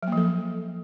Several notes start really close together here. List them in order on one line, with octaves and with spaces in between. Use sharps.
F#3 A#3 F3 A4